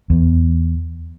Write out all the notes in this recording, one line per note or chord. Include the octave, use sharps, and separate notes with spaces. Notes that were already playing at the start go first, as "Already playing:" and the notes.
E2